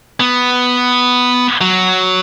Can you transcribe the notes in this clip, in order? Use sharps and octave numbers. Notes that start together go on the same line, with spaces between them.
B3
F#3